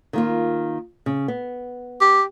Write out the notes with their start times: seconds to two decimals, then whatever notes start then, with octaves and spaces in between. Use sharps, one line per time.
0.13 D#3 A#3 F4
1.06 C#3
1.28 B3
2.01 G4